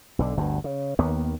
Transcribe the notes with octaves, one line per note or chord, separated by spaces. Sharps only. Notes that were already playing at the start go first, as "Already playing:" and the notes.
B1 D3
G1 D2 G2
C#3
D#2 D#3 A#3 B3